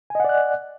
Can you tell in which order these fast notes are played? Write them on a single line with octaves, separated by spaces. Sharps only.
G#5 D#5 F#5 D5 F#6